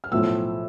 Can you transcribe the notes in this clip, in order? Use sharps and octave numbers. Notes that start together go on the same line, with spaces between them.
F6
B1 A2 F3 A3 E6